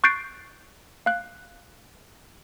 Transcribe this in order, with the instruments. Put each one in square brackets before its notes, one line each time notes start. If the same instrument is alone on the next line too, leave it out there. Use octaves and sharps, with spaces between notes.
[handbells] C#6 F#6 G6 A6 C7 D7
F5 F#6